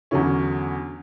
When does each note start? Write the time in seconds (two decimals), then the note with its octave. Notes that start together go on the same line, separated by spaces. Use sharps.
0.11 E2 D3 F#3 C#4 E4